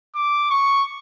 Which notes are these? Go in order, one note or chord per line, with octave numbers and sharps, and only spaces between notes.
D6
C#6